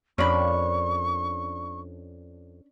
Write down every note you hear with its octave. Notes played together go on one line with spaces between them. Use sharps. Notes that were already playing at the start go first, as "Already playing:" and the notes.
F2 C#4 D4 A#4 B5 C#6